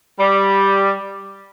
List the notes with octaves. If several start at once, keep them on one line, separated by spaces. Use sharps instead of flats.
G3